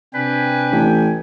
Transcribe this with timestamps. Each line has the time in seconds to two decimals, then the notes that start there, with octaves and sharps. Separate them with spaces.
0.14 C3 D4 B4 G5 G#5
0.72 A1